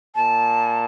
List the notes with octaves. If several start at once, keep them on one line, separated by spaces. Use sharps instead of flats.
A#2 A5